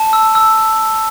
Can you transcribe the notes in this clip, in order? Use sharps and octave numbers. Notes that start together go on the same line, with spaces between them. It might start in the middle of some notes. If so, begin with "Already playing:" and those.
Already playing: A5
E6
E6